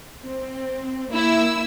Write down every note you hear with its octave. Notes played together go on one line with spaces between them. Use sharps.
C4
A#3 E4 E6